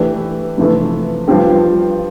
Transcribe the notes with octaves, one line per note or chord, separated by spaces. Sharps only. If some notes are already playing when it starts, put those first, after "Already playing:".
Already playing: E3 A3 D4 G4
F2 C3 E3 A3
G2 F3 C4 G4